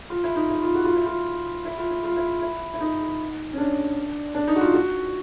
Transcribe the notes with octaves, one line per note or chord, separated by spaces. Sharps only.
F4
E4
D#4
E4
F4
F#4
F4
E4
F4
E4
F4
E4
F4
E4
E4
E4
D#4
C#4
D4
D4
D#4
F#4
F4
F#4